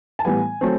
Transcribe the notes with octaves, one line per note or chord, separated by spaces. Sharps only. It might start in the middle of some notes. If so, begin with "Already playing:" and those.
A5
A2 E3 G3 B3 G#5
F#3 A3 C4